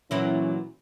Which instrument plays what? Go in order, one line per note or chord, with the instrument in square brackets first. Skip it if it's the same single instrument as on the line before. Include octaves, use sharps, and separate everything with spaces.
[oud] A#2 F#3 E4 [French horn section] E3 C#4